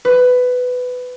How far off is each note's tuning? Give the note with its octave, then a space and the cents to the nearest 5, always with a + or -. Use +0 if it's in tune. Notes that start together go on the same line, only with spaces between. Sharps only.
B4 +15